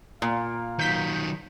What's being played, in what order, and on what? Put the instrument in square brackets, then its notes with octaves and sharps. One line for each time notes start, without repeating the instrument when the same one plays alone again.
[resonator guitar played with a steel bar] A#2 [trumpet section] A#4 F5
[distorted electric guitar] D#3 F#3 [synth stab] G6 B6